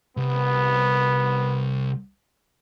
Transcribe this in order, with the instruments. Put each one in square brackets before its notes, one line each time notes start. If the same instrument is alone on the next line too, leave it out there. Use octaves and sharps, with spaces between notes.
[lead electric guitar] C2 [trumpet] B3